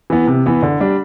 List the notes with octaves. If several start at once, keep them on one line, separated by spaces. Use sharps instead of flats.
E3 B3
C3
E3 B3
D3
G3 D4